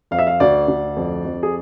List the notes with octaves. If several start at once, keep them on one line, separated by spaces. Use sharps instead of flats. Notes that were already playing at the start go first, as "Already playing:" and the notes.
F2 F5
E5
F5
D2 D5
D2
F2
F2
G#4